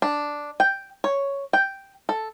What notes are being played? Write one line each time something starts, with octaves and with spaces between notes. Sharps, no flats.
D4
G5
C#5
G5
A4